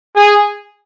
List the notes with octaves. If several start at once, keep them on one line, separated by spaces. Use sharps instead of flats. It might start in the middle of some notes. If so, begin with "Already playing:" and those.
G#4